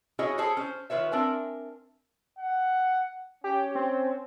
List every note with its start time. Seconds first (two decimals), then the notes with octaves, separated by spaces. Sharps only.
0.19 C#4 E4 F#4 G#4 C#5 D#5
0.38 E4 G#4 A4 C5
0.57 C#4 C5
0.90 D#3 F4 B4 C#5 E5
1.11 C4 D4 A#4 E5 G#5
2.39 F#5
3.44 C#4 G4
3.75 C4